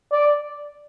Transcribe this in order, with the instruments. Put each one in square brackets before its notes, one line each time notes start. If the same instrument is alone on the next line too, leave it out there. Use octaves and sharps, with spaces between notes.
[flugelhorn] D5